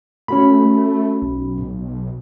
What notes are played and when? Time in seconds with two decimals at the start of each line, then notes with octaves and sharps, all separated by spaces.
0.28 A3 C#4 F#4 B5
0.62 A3
1.22 B1